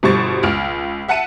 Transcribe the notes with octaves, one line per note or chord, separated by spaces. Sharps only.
G1 B2 G3 C5 C#6 A6
C#2 F6 D7
E5 F#5 A5 C#7 D#7